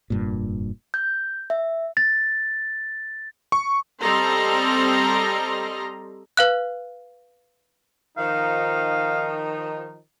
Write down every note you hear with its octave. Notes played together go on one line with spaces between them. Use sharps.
F1 G2 A#2
G6
E5
A6
C#6
G3 C4 A4 D#5 A#5 C6
B4 F5 F#6
D#3 F3 D#4 F5